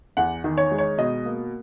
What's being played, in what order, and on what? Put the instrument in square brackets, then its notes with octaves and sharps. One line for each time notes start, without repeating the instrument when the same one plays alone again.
[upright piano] E2 F#5
D#3
C#5
G#3
C#5
B2 D#5
A#3